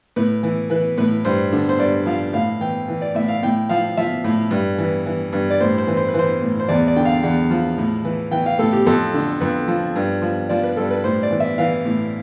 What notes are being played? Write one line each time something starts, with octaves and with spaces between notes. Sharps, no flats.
A2 B4
E3
E3 B4
A2 B4
G2 C5
D3
C5
G2 D5
F3 F5
A2 F5
E3 G5
E3
D5
A2 E5
F5
A2 G5
F3 F5
F3 E5
A2
G2
E3
E3
G2
D5
A2 C5
C5
E3
C5
B4
E3 C5
A2
C5
E2 D5
D5
D3 G5
F5
E2
F3
A2
E3
E3 G5
F5
A2 A4
G4
F2 A4
D3
F2 B4
F3
G2
F3
F3 D5
B4
G2 A4
B4
A2 C5
D5
E3
E5
E3 F5
A2